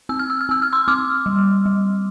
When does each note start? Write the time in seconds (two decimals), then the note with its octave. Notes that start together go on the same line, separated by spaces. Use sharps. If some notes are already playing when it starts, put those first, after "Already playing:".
0.09 C4 E6
0.19 F6
0.30 E6
0.41 F6
0.49 C4 E6
0.62 F6
0.72 C6 E6
0.88 C4 D6 F6
1.26 G3
1.66 G3